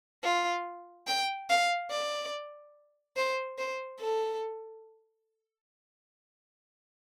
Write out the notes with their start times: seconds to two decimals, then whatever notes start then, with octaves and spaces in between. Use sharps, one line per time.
0.23 F4
1.07 G5
1.50 F5
1.91 D5
3.17 C5
3.58 C5
4.00 A4